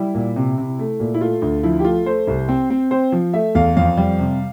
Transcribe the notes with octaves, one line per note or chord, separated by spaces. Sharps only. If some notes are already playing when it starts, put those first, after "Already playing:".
Already playing: G3 E4
A#2
C3
C3
A3
A#2
E4
A3 F4
D2
F3 E4
G4
A3 F4
A3 C5
C2
C4
C4
C4 C5
F3
A3 E5
E2 F5
F2 F5
G3
C3